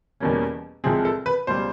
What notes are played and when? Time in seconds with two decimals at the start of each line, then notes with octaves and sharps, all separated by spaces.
0.20 E2 B2 G3 A#3 C#4
0.84 C2 C3 F3 G#3 C4 G#4
1.05 A4
1.26 B4
1.47 C#2 B2 G3 C5